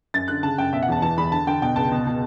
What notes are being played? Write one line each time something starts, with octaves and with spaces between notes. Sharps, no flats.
F#2 A6
D3 F#6
C#3 A5
F#2 G5
B2 E5
F#5
E2 A5
E3 A5
E2 B5
D3 A5
D3 G5
B2 G5
C#2 A5
B2
B2